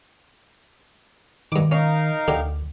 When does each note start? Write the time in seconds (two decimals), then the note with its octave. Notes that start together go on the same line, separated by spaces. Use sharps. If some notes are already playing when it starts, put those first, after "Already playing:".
1.52 G2 D#3 D6
1.72 C#4 D#4 A#4 F5
2.28 D2 D3 G4